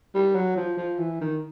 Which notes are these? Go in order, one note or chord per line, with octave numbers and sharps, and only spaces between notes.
G3
F#3
F3
F3
E3
D#3